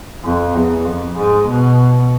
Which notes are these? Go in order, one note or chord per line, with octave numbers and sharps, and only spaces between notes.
F2
E2
F2
G#2
B2